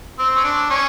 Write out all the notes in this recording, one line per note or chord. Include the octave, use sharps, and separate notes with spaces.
C4
C#4
D4
C#4